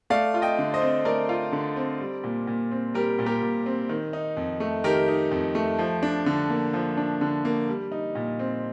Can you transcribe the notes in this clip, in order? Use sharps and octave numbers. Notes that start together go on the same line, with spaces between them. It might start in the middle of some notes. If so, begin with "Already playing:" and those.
A3 D5 F5
F4
D#5 G5
D3
C5 D#5
C4
A3 A#4 D5
F4
D3
C4
G3
A#2
A#2
C4
G3 G4 A#4
A#2
G4 A#4
A#2
C4
D#3
D#4
F2
A3
D#3 G4 A#4
D#4
F2
A3
F3
D4
D3
A#3
F3
D4
D3
A#3
G3
D#4
A#2
C4